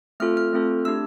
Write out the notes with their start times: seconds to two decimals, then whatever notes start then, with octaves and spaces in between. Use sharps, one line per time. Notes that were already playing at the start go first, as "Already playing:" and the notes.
0.20 A3 C4 F4 A4 F6
0.37 F6
0.53 A3 C4 F4 A4
0.85 A3 D4 G4 E6